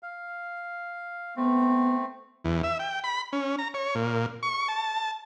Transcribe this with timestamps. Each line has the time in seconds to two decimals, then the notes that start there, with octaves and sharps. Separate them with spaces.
0.03 F5
1.36 A3 B3 C4
2.45 E2
2.63 E5
2.79 G5
3.04 B5
3.33 C#4
3.58 A#5
3.74 C#5
3.95 A#2
4.43 C#6
4.68 A5